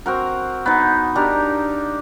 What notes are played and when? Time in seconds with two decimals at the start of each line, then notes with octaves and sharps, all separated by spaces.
0.06 C4 F#4 A#4
0.66 B3 D#4
1.15 D4 D#4 G4 A#4